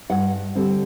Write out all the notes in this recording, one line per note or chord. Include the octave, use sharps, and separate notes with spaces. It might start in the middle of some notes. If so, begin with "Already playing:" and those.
G2 F#5
D3 G3 C4